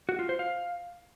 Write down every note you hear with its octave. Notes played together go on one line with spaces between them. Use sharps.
F#4
F4
C5
F5